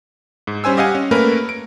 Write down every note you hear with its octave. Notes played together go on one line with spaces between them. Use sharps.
G#2
G3 C#4 C5 G#5 E6
G4 D#5 F5 F#5 G#5
C#4
A3 A#3 C#4 A#4 B4
D7